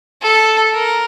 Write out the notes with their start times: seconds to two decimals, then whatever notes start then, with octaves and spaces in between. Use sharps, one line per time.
0.22 A4
0.74 A#4